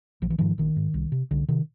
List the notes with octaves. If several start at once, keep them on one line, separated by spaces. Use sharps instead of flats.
A#1 F3
E3
G#2 D#3 F3
A#1 D#3
G#2
C2
C3
C2 D3
C3 D#3